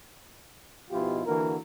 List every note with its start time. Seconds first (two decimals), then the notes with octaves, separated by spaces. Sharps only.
0.91 G#2 B2 F3 E4 F4 G4
1.26 D3 E3 A#3 F#4 A#4